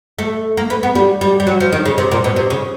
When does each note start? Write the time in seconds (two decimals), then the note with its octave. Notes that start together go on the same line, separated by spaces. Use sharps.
0.19 A3
0.57 A#3
0.70 B3
0.83 B3
0.95 G3
1.21 G3
1.40 G3
1.47 F#3
1.60 F3
1.73 D#3
1.85 C#3
1.98 C3
2.11 A#2
2.24 B2
2.36 C3
2.50 C#3